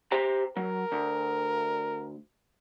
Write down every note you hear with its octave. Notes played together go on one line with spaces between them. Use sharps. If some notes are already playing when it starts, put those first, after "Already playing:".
G4 C5 A#5
F#3 A#4
D2